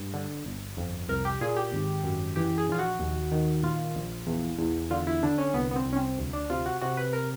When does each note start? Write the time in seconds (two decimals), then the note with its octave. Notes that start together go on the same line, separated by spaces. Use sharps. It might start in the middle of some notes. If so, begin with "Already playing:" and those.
Already playing: G2
0.14 D3
0.46 G1
0.77 F2
1.09 C2 A#4
1.25 G4
1.41 A#2 G#4
1.56 G4
1.73 G#1
2.04 F#2
2.36 E3 G4
2.58 G#4
2.68 A#1 F4
2.79 F#4
2.99 D#2
3.32 D#3
3.63 A#2 F4
3.95 A#1
4.27 E2
4.58 E2
4.91 D3 F4
5.07 E4
5.23 D3 D4
5.38 C#4
5.54 C2 B3
5.71 B3
5.76 C4
5.86 C2
5.93 C#4
5.96 C4
6.18 D2
6.33 D4
6.50 C3 F4
6.66 F#4
6.81 C3 F#4
6.97 B4
7.13 A#4